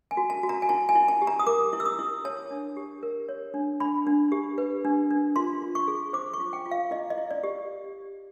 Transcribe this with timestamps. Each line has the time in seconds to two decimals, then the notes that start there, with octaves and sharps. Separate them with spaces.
0.11 G#5
0.17 F#4
0.30 A5
0.43 F#4
0.49 A#5
0.62 G#5
0.69 E4 A5
0.89 G#5
0.95 E4
1.08 A5
1.22 G4
1.27 A#5
1.39 D#6
1.47 A#4 D6
1.73 E4
1.80 E6
1.86 D#6
1.99 E4
2.25 C#5 A5
2.51 D4
2.77 G4
3.03 A#4
3.29 C#5
3.54 D4
3.80 D4 B5
4.07 D4
4.32 G4
4.58 B4
4.85 D4
5.11 D4
5.36 F4 C6
5.62 F4
5.75 C#6
5.88 G#4
6.13 C5 D6
6.33 C#6
6.40 F4
6.53 G5
6.66 F4
6.71 F5
6.91 E4 D#5
7.10 D#5
7.17 E4
7.31 D5
7.43 G4